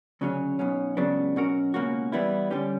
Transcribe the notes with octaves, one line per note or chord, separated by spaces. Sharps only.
D2 C#3 F#3 C#4
B1 B2 F#3 C#4
C#2 C#3 F#3 B3 D4
B2 F#3 C#4 F#4 A#4
C#2 B2 A#3 C#4 F#4
E3 G3 B3 E4
D3 G3 C#4 G4